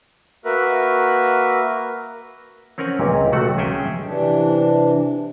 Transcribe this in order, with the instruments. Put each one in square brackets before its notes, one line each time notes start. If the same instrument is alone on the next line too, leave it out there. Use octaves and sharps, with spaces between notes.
[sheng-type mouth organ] A#3 F#4 A#4 B4 E5
[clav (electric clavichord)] C4 C#4 A#4 C#5 F#5 G#5
C#2 A#2
C3 F#3 A3 F#4 F#5
C#4 G#4 E5 G5
[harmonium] C3 E3 D4